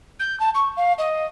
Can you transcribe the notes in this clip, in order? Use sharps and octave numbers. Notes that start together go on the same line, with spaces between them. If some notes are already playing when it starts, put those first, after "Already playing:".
G6
A5
C#6
F5
D#5